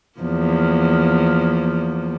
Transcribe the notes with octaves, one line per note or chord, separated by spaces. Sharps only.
E2 F3 A#3